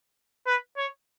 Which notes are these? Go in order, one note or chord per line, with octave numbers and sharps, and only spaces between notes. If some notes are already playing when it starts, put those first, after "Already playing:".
B4
C#5